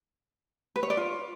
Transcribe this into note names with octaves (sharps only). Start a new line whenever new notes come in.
B4
C#5
D5
F4